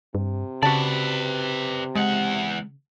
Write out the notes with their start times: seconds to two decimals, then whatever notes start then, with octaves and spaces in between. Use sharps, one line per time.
0.15 G2 C3
0.63 C#3 F#4 B4 D5 A5
1.95 E2 G#3 F#5